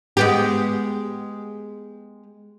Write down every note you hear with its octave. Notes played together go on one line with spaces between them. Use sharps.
G#3 B3 G4